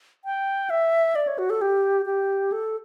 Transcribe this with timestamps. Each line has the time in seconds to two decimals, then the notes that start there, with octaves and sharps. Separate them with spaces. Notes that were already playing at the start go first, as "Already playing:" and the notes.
0.25 G5
0.70 E5
1.15 D5
1.27 C#5
1.38 F#4
1.50 A4
1.61 G4
2.06 G4
2.52 A4